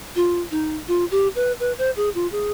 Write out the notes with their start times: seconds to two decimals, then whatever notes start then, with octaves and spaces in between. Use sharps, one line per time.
0.16 F4
0.51 D#4
0.88 F4
1.11 G4
1.35 B4
1.60 B4
1.78 C5
1.96 G#4
2.15 F4
2.32 G#4